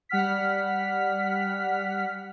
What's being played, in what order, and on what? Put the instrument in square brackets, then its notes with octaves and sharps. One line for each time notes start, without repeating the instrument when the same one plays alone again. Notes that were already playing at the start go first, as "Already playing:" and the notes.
[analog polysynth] G3 F#5 F6 B6